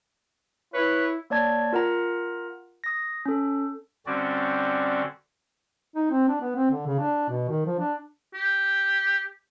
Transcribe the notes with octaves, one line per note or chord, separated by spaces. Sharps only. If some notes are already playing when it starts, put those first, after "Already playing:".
E4 B4 C#5
A#3 C#5 D5 A5 G#6
F4 A#4 F#5 A#5
D#6 A#6
C#4 A4
D3 G3 C4 C#4 F#4 D5
D#4
C4
D4
B3
C4
D3
C#3
D4
B2
D#3
F3
D4
G4